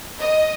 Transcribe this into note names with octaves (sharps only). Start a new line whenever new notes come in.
D#5